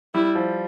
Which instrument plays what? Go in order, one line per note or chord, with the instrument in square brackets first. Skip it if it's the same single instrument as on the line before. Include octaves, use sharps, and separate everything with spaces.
[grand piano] G3 [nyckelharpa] E4
[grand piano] F3